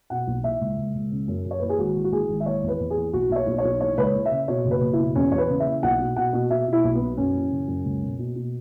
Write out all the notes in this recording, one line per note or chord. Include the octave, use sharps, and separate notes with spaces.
B2 F#5
B1
E3 E5
C#2
C#2
C#2
C#3
F#2
F#2
C#5
E3 B4
G#4
G#1 F#4
E3
F#4
E3 G#4
G#1
E5
E3 C#5
E2
B4
E2
G#4
E3
B1 F#4
B1 E5
C#5
B1
C#5
B1
E3 C#5
C#2 B4
C#5
E3
E5
C#3
B2 C#5
F#1
B4
F#1
E4
B2
E2 C#4
E2 C#5
B4
C#3
E5
E3
B1 F#5
B2
B2 F#5
B2
B2 E5
B2
E4
B1
B3
B2
F#2 C#4
E3
C#3
F#2
C#2
B2
B2
B2